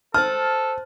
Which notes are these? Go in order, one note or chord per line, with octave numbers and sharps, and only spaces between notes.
A4 C5 A5 F6